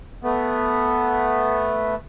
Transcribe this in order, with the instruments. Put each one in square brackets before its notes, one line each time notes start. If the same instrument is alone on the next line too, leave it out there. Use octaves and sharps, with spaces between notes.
[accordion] A3 B3